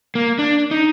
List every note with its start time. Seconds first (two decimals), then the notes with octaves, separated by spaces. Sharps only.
0.15 A#3
0.39 D4
0.71 D#4